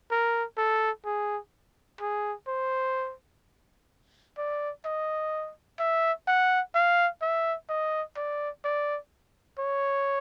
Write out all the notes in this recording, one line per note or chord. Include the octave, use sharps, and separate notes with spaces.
A#4
A4
G#4
G#4
C5
D5
D#5
E5
F#5
F5
E5
D#5
D5
D5
C#5